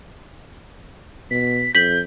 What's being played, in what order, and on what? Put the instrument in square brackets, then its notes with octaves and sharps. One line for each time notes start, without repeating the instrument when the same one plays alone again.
[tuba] B2 [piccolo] B6
[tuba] F2 [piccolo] G6 [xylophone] B6 F#7